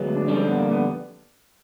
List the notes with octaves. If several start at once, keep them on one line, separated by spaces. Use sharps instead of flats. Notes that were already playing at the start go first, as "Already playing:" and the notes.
Already playing: D2 F#3 G#3 B3
D4
F2 D3 G3 C#4
C4
B3
A#3
B3